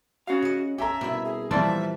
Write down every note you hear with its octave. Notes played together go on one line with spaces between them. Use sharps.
C#4 F#4 F5
C#3 D#5
G4 A4 E5 G#5 A#5
C2 B2 E4
G#4
A#2 E3 F3 G3 C4 D5 E5 A5